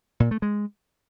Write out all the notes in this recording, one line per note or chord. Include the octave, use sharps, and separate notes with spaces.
A#2
A3
G#3